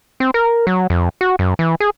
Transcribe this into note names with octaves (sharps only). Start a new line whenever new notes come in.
C4
A#4
F#3
F2
F#4
F#2
E3
G#4